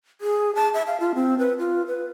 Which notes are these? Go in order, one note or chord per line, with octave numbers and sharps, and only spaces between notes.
G#4
A5
E5
F5
F4
C4
B4
F4
B4